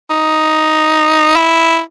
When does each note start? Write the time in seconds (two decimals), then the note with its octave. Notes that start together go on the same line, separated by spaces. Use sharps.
0.10 D#4
1.36 E4